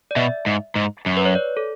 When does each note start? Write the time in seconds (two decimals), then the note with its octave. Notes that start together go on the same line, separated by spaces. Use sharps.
0.11 D5
0.16 B2 E5
0.46 G#2
0.75 G#2
1.06 F#2
1.17 B4
1.25 C#5
1.35 D5
1.57 A4